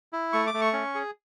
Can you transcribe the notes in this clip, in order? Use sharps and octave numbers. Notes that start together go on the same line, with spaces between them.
E4
A3 C#6
D6
A3
C#6
C#4
G#4